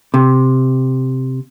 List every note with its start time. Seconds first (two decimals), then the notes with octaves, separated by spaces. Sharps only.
0.14 C3